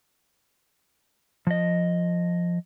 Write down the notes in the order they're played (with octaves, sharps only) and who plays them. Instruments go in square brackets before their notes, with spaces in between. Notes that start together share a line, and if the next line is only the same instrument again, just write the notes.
[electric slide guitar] F3 D#5